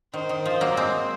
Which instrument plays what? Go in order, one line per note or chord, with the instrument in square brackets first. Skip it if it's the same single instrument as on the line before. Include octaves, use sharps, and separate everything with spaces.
[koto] D#3 [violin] C5
[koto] D#3
F3
F#3 A#3
[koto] G#3 C4 [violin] C5